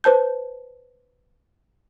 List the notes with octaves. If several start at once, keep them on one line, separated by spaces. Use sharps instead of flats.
B4 C5 A5 G6